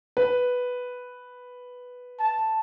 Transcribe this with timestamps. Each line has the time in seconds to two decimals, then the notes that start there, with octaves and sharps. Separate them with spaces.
0.17 B4
2.19 A5